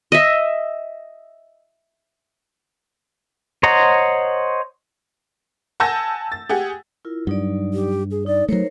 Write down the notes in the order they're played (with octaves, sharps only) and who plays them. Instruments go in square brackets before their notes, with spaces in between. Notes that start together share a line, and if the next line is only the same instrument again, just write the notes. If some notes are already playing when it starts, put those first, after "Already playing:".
[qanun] D#5 E5
[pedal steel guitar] C5 C#5 D#5 F#5 A#5
[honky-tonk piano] F#5 G#5 A5 E6 G6 A#6
A6
G4 G#4 F#5
[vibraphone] E4 F4 A#4
[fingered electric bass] G2 [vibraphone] F#3 D#4 D5
[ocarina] G4
G#4
[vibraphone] D#4 [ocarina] D5
[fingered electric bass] F#3 A3 [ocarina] D#4 [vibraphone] A#4 C5 C#5